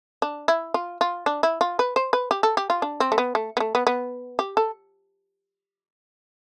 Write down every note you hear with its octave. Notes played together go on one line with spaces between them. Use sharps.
D4
E4
F4
F4
D4
E4
F4
B4
C5
B4
G4
A4
G4
F4
D4
C4
A3
B3
A3
B3
A3
B3
B3
G4
A4